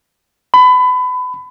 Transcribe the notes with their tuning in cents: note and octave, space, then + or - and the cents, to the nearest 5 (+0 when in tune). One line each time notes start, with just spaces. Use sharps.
B5 +25